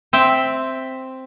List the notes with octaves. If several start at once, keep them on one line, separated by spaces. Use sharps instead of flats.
C4 E5 G5